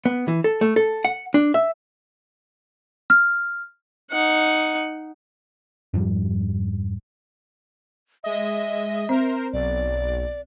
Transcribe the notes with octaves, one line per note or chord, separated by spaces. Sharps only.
B3
E3
A4
A3
A4
F#5
D4
E5
F6
D#4 F#5
F2 G#2 F3 G3
G#3 D#5 E5
C4 A#4 C5
B1 D5